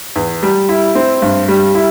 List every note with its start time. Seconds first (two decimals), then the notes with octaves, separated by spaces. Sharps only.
0.16 E2
0.43 G3
0.69 E4
0.95 C4
1.22 G2
1.48 G3
1.75 E4